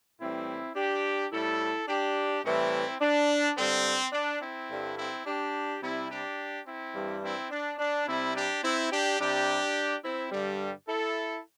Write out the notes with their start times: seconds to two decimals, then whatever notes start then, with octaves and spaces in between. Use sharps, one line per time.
0.20 A2 E3 G3 C4 E4
0.75 D4 G4
1.32 A2 G3 E4 A4
1.88 D4 G4
2.44 A2 E3 G3 C4 E4
3.01 D4
3.57 G2 D3 G3 C4
4.13 D4
4.42 C4 E4
4.70 G2 D3 G3
4.97 C4 E4
5.26 D4 G4
5.82 C3 G3 C4 E4
6.10 D4 G4
6.66 C4 E4
6.95 G2 E3 G3
7.22 C4 E4
7.51 D4
7.79 D4
8.07 C3 G3 C4 E4
8.35 D4 G4
8.63 C4 E4
8.91 D4 G4
9.20 C3 G3 D4 G4
10.04 C4 E4
10.31 G2 D3 G3
10.88 E4 A4